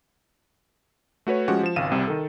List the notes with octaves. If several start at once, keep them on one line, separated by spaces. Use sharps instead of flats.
A3 F#4 B4 C#5
F3 G#3 C#4 F#4 G4 F#5
F3 E7
G#1 C#2 F5 D#7 E7
C2 C3 G3
D#3 A4